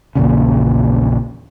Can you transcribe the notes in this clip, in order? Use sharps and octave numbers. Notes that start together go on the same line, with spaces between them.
A#1 E2 A#2 C#3